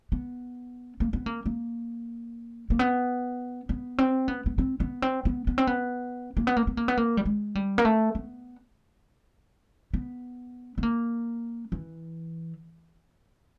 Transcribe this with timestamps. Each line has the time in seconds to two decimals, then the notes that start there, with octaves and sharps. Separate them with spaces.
0.12 B3
1.00 A#3
1.13 B3
1.26 A#3
1.46 A#3
2.70 A#3
2.79 B3
3.69 B3
3.98 C4
4.28 B3
4.46 B3
4.58 C4
4.80 B3
5.02 C4
5.25 B3
5.47 B3
5.58 C4
5.67 B3
6.37 A#3
6.47 B3
6.57 A#3
6.67 B3
6.77 A#3
6.88 B3
6.97 A#3
7.17 G3
7.25 G#3
7.55 G3
7.78 A#3
7.85 A3
8.15 B3
9.93 B3
10.78 B3
10.83 A#3
11.72 E3